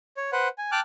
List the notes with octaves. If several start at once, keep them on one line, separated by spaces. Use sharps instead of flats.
C#5
B4 C5 F#5
G#5
G5 A5 D6 F6 F#6